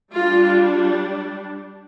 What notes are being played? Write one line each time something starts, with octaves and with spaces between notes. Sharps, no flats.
G3 D4 F4